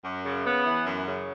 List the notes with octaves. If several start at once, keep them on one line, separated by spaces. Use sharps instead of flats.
F#2
C#3
B3
E3
F#2
C#3